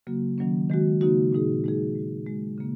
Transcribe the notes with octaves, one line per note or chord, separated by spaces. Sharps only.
C#3 F#3 A#3 F#4
D#3 F#3 A#3 C#4
D#3 G#3 F#4
C#3 A#3 D#4 F#4
A#2 G#3 D#4 G#4
G#3 D#4 G#4
G#3 F#4
G#3 F#4
C#3 A#3